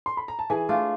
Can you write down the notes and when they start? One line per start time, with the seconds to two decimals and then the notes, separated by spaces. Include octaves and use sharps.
0.06 C6
0.17 B5
0.28 A#5
0.39 A5
0.50 E3 G#4 G#5
0.69 A3 D4 F4